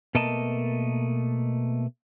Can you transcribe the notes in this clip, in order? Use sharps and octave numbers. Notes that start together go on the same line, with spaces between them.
B2 A3 A#3 A#4 D#5 A5